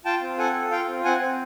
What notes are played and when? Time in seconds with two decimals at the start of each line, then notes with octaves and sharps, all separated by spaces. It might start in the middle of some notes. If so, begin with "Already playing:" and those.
0.05 F4 G5 A5
0.22 C4
0.38 A4 F#5 G#5
0.55 F4
0.71 F4 F5 G5
0.87 C4
1.04 C4 F#5 G#5
1.20 C4